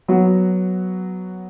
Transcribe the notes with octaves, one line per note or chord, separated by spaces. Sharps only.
F#3 B3 F#4